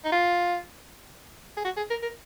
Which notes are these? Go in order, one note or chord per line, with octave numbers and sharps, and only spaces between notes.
D#4
F4
G#4
F#4
G#4
A#4
A#4